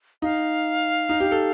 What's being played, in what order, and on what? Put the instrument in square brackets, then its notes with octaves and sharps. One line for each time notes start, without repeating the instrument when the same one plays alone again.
[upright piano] D#4 [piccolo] F5
[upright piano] D#4
G4
A4